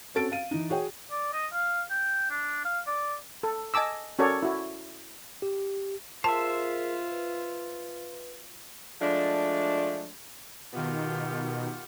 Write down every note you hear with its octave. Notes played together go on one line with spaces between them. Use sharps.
C4 C#4 F#4 A4 A6 D7
F5 D#7
E3 D#4
F#4 G#4 C#5 G5
D5
D#5
F5
G5
D4
F5
D5
A4
D#5 G#5 A5 D6 E6
C#4 F#4 A4 A#4 C#5 D5
E4 F#4
G4
F4 G#4 A#4 C5 E5 A5
B4
F3 G#3 A3 D4
B2 D#3 F4 G4 F#5